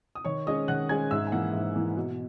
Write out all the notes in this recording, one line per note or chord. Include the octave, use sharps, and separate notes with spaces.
D#6
D#3 C#5 C#6
G#3 C#4 D#5 D#6
D#3 F#5 F#6
G#3 C#4 G#5 G#6
G#2 E5 E6
G#5
E3 A#3 E4 F#5
G#2 E5
E3 A#3 E4
B2